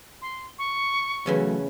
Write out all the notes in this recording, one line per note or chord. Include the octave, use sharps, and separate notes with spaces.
C6
C#6
E2 C#3 E3 F#3 A3